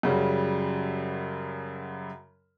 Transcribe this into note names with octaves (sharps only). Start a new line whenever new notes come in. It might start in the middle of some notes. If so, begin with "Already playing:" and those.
F#2 C#3 F#3 G3